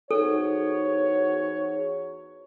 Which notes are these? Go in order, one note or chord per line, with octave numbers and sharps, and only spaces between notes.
E2 D#4 F#4 G#4 A4 C5 C#5